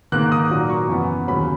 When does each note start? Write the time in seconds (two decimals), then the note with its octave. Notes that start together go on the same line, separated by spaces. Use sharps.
0.12 G#2 D#3 A#3 F#6
0.32 D#6
0.51 A#2 F#3 A#3
0.70 C#6
0.89 F#2 E3 B3
1.27 D#2 C#3 F#3 C#4 B5